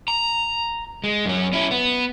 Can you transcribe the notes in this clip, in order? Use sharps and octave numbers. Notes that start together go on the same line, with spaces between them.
A#5
G#3
F#2 C#4
C#4 E4
B3